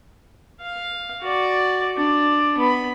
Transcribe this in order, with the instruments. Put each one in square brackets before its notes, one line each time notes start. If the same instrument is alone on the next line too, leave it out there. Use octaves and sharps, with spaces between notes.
[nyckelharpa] F5
F#4 D5
D4
B3 B5